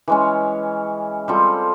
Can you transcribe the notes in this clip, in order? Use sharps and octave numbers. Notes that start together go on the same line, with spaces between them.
E3 G#3 C#4
G3 C4 F4 A4